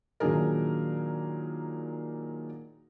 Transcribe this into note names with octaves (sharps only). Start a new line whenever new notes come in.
A#2 D#3 F#3 D4 G#4 A#4